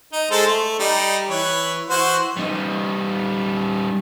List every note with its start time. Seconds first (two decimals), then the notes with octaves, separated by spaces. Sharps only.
0.13 D#4
0.31 G#3 A4 C5
0.47 A3
0.79 G3 D#4
1.29 E3 B4 C#5
1.89 E3 F#4 C5
2.36 G3 D#4